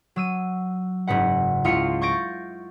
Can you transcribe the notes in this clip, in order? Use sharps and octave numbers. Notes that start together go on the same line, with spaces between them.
F#3 E6 D#7
F#1 G#2 C#3 B4 F#5
C#2 E4 F4 F5 C#7
C#6 G6 A6 A#6 D7